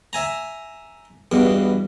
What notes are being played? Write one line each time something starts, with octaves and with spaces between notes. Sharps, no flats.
E5 G#5 A#5
E2 G2 B2